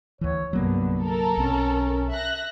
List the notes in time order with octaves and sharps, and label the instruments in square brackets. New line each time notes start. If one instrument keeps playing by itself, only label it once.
[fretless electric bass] D2 E3 [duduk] C#5
[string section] C2 G2 D3 [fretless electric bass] F#3 A#3 [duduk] B3
[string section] A4 A#4
[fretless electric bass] B1 C4 [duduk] C#4
[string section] E5 F#6 A#6